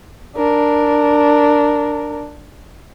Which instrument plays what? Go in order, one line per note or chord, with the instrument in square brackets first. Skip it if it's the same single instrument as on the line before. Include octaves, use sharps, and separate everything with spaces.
[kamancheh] D4 A#4